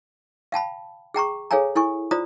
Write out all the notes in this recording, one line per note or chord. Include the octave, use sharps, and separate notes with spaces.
F5 G5 A5 B5
G#4 G5 A#5 C#6
G#4 A4 C#5 F5 G#5 A#5
E4 A4 G#5 C#6
F4 C5 D5 A#5 D#6